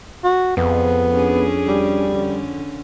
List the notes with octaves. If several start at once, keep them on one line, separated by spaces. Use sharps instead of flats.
F#4
F2 F3 B3 G#4
C#4 D4 G#4
G3
D3 C#4